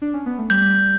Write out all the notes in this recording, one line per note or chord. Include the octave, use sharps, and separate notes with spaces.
D4
C#4
B3
A3
G3 G6